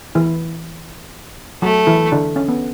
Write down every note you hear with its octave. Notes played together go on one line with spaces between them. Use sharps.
E3 E4
F#3 A3 F#4
E3 E4
D3 D4
C#4
B3